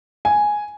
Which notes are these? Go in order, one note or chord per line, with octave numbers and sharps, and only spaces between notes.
G#5